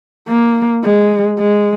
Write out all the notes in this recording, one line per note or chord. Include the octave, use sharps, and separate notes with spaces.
A#3
G#3
G#3